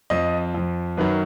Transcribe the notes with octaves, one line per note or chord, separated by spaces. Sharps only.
F2 F3 D#5
F2 F3
F#2 D#3 F#3 B4